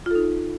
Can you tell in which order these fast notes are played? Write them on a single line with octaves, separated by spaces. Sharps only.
F4 A4 D#4